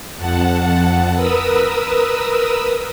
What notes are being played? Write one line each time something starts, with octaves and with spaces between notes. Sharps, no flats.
F2 F#5 A5
A#4 B4 D#6 E6